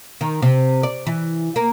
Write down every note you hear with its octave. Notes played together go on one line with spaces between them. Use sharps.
D#3
C3
D5
E3
A#3